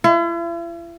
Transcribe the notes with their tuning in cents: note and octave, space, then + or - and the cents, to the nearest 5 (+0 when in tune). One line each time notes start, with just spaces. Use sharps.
E4 +45